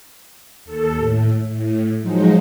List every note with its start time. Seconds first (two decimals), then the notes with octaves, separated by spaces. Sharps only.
0.65 D#2 A4
0.98 A2
1.49 A2
2.02 F3 F#3 G#3 D#4